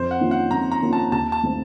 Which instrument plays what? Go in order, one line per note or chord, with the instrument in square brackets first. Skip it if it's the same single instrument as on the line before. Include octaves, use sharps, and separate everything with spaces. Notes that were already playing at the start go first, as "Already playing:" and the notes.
Already playing: [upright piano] F2 [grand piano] C5
[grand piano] F#5
[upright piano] D#3 A#3 C#4 F4
[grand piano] F#5
[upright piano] F2 [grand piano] A#5
[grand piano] A#5
[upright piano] D#3 A#3 C#4 F4
[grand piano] A5
[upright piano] D#2 [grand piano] A5
[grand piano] A5
[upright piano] D#3 A3 C4